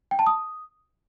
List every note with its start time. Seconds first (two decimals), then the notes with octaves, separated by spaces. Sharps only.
0.11 G5
0.19 A5
0.27 D#6